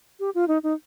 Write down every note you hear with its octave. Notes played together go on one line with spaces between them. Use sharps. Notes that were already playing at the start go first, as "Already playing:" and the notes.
G4
F4
D#4
D#4